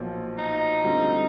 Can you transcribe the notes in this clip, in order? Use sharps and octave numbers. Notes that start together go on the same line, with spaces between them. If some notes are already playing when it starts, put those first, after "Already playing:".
Already playing: B1 A#2 F3
D#4
D2 D3 G3 C4 F4